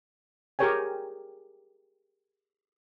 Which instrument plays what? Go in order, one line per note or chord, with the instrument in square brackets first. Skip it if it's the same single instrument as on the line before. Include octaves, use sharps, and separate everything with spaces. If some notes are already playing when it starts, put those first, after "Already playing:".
[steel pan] G4 G#4 A#4 C#5 G5 G#5